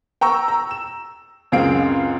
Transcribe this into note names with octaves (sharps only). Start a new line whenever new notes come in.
G5 A#5 C#6 E6
A#5
E7
C#2 F#2 C4 G#4 F5 D7